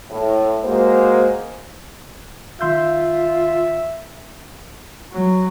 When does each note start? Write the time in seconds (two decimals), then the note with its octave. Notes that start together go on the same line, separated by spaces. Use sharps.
0.11 A2
0.65 G#3 A#3 F#4 C5
2.61 D#3 F4 E5 C6 G6
5.12 F#3